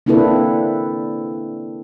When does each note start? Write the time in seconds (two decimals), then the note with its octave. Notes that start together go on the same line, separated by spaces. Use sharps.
0.06 A#3 C4 D4 E4 A4 B4